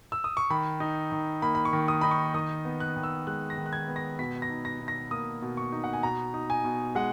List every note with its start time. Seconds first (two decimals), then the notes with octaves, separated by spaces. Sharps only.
0.12 E6
0.24 D#6
0.37 C#6
0.50 D#3 B5
0.80 D#4
1.12 D#3
1.42 A#3 B5
1.55 B5
1.65 C#6
1.73 D#3
1.88 D#6
2.01 D#4 B5
2.11 C#6
2.34 D#3 D#6
2.65 B3
2.80 F#6
2.96 D#3
3.03 E6
3.27 G#3 F#6
3.50 A#6
3.58 D#3
3.66 F#6
3.73 G#6
3.88 B3
3.96 A#6
4.19 B2 B6
4.42 A#6
4.49 D#4
4.65 A#6
4.81 B2
4.88 A#6
5.11 A#3 D#6
5.42 B2
5.57 C#6
5.72 D#4
5.84 F#5
5.93 G#5
6.03 B2 A#5
6.34 D#4
6.50 G#5
6.64 B2
6.95 G#3 F#5